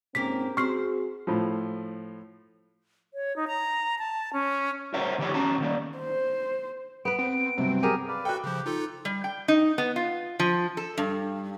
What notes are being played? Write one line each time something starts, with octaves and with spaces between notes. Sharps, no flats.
G#2 A#3 C4 C#4 G4 A#4 B6
C4 F#4 G#4 C5 C#6 F6 C7
A2 F3
C#5
D#4
A#5
A5
C#4
A#4 C5 C#5 E5 F#5 A#5
D3 D#3 F3 G4 C#5 B5
E2 C#4 A5 A#5
D#3 A#3 D5
C5
B3 B4 D7
C4 D7
G2 C3 F#3 C4
G4 G#4 A#4 D#7
B4 D5 F5
F#4 A4 G5 F#6
C#3 F3 G4
D#4 F4 A4
G3
G5
D#4
B3
F4
F3
A4
G2